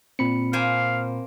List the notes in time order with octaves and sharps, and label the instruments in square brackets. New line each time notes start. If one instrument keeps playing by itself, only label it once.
[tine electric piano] A#2 B5 C#7 [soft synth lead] C4
[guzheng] A#3 C5 G#5 [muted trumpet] F5